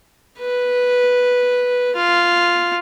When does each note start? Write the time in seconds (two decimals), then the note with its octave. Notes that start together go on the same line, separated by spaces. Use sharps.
0.39 B4
1.96 F4